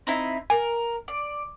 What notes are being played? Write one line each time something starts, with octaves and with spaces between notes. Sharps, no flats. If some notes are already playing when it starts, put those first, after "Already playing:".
C4 D#4 E4
A#4 G#5
D5